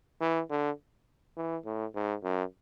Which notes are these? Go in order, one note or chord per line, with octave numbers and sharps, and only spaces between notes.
E3
D3
E3
A2
G#2
F#2